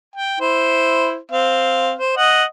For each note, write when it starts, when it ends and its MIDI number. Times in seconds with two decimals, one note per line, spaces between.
0.16 0.40 79
0.40 1.16 64
0.40 1.16 72
1.32 1.93 60
1.32 1.93 77
1.99 2.16 72
2.17 2.43 75
2.17 2.43 78